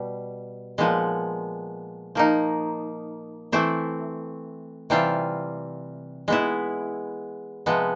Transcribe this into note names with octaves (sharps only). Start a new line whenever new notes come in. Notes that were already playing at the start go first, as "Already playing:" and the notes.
Already playing: B2 G3
A#2 F3 G#3 B3
F3 A#3 D#4
E3 A3 C4 E4
C3 E3 G3 C4 F4
G#3 B3 E4
C3 F3 G#3 B3